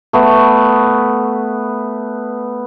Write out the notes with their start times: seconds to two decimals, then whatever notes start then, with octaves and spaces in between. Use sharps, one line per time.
0.13 A3 B3